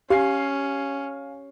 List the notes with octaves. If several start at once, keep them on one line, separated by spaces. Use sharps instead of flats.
C#4 G4 F5 G#5 C7